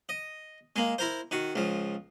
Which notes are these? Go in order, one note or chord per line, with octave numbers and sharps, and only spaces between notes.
D#5
G#3 A#3
E4 A#4 C5
D#3 F#4
C#2 F3